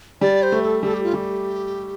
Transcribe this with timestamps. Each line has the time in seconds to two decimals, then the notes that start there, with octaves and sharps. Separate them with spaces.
0.21 G3 D5
0.43 C5
0.52 A3
0.62 A4
0.82 G3 A4
0.94 G4
1.04 F4
1.13 G3 G4